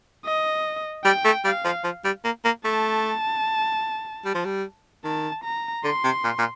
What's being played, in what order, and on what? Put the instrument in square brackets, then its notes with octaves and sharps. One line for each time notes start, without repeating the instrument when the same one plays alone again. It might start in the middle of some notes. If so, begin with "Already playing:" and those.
[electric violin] D#5
[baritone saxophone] G3 [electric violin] G5
[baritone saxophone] A3
[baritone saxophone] G3 [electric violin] F5
[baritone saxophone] F3
F3
G3
A#3
A#3
[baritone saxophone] A3 [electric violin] A5
[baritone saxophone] G3
F3
G3
[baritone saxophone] D#3 [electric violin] A5
[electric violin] A#5
[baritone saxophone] D3 [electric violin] C6
[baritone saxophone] C3
A#2
A#2